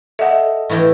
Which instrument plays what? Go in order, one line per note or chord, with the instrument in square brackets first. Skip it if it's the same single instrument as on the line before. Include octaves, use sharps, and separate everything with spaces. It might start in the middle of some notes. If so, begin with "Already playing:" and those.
[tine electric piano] A4 D#5 [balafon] E5 F#5
[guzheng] A2 E3 G5